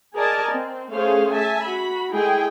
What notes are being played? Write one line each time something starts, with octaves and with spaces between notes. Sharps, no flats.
G#4 A#4 D5 D#5 G#5 A5
C4
A3 C#4 G#4 C5 F5
E5 G#5 A5
F#4 B5
G#3 A3 E4 G#4 G5 G#5